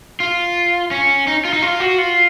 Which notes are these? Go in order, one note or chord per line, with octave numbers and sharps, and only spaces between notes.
F4
C#4
D#4
F4
D#4
F4
F#4
F4